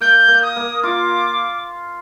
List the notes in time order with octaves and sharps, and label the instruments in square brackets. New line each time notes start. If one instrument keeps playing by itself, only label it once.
[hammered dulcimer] A#3 [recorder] G6
[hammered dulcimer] A#3
[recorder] D#6
[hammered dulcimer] A#3
[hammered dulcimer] F4 [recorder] D6